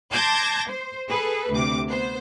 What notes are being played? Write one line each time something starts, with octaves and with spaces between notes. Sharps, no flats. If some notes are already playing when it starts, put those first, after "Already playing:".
A5 C6 D6 G6 G#6 A#6
C5
G#4 A4 B4
D2 C3 D6
B3 C5